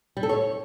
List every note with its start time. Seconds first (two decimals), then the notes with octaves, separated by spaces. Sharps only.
0.17 G3
0.23 A4
0.29 C#5